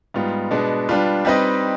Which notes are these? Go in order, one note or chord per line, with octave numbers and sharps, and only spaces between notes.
G#2 G3 B3 F4
B2 G#3 B3 D4
G3 D4 F4 B4
G3 C4 D#4 B4 D#5